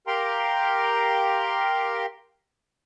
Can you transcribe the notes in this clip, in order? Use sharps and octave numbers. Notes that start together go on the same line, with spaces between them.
G4 A#4 F5 G5 A#5 C6